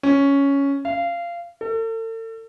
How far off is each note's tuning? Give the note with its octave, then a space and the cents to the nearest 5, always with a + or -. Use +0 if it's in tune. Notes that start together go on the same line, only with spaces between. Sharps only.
C#4 +5
F5 -20
A4 +40